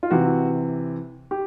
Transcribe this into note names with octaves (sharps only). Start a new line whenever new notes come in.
F4
C3 E3 F#4
G4